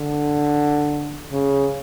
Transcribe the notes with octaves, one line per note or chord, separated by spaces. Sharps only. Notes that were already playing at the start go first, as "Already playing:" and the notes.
Already playing: D3
C#3